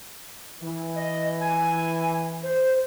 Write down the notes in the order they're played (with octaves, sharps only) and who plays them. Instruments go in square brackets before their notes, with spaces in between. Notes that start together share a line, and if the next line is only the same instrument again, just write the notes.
[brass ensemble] E3
[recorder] D#5
G#5
C5